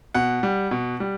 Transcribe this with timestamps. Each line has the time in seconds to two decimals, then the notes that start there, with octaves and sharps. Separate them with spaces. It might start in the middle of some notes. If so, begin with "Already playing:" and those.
0.14 B2 F#5
0.43 G3
0.71 B2
1.00 G3